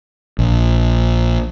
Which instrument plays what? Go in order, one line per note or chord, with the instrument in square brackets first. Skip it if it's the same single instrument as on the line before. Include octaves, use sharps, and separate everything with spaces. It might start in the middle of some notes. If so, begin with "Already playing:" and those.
[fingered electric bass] A#1